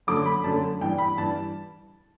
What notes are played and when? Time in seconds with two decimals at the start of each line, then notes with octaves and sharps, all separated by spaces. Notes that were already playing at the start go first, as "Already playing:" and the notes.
0.07 F#2 D3 F#3 A3 D6
0.26 B5
0.44 F#2 D3 F#3 A3 A5
0.81 G2 E3 G3 G5
0.98 B5
1.18 G2 E3 G3 A5